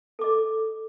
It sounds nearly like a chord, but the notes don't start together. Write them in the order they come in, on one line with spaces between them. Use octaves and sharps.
A4 D6 D#5